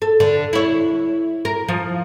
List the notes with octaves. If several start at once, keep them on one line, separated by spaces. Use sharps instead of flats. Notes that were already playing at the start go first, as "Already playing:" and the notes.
A4
D3
E4 C#5
A#4
F3